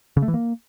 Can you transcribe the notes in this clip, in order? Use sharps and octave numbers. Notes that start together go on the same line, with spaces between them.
C#3
A3
E3
A#3